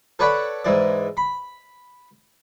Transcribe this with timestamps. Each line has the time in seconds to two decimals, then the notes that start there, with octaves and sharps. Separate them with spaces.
0.19 A4 B4 C#5 D5 F#5 B5
0.65 G#2 E3 D5
1.17 B5